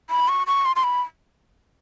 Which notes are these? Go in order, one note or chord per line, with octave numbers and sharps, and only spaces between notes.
B5
C#6
C#6
C6
C6
B5